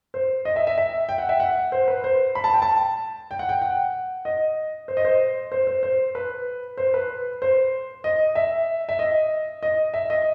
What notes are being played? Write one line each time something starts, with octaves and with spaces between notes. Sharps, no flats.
C5
D#5
E5
E5
E5
G5
F#5
E5
F#5
C5
B4
C5
B5
A5
G5
A5
G5
F#5
G5
F#5
D#5
C5
D#5
C5
C5
C5
C5
B4
C5
B4
C5
D#5
E5
E5
D#5
D#5
E5
D#5